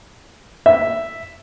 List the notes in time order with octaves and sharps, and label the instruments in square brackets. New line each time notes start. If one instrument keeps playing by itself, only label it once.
[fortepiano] E5